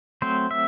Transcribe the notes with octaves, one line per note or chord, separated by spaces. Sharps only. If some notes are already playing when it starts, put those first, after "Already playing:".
F#3 A3 C4 C5
E5